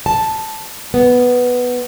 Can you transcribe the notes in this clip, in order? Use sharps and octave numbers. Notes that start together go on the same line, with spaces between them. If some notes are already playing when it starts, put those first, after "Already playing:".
A5
B3